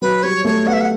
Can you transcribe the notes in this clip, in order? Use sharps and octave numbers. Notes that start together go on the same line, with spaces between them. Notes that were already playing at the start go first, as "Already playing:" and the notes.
F#3 B4
G3 C#5
A3 C#5
B3 F#5
E5
F#5